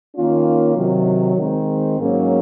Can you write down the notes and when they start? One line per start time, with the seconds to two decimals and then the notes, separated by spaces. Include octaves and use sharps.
0.16 D#3 A#3 C#4 F4
0.77 C3 D#3 F#3
1.37 D#3 G#3 C4
2.00 G#2 F#3 A#3 C#4